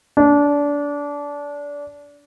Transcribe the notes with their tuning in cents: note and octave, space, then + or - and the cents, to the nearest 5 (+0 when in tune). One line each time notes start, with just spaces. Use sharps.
D4 -25